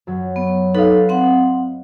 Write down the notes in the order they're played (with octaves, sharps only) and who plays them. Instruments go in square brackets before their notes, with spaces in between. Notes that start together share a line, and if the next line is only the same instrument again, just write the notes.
[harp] F#2 F#3
[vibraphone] B3
[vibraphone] D#4 A4 [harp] B4 D#5 F5
[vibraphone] C4 F#5 [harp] C6